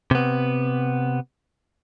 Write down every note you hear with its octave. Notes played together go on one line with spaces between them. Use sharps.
C3 B3